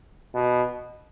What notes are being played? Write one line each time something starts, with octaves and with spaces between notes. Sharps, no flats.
B2